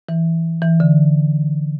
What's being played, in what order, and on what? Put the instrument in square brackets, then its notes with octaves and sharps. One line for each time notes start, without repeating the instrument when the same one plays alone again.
[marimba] E3
E3
D3